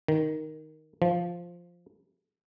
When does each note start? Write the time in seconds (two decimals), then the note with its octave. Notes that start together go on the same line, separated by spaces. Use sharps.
0.08 D#3
1.02 F3